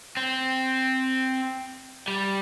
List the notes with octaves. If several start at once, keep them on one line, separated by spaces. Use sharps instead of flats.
C4
G3